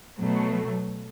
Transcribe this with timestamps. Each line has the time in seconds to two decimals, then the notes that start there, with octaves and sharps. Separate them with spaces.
0.20 B2 F#3 A3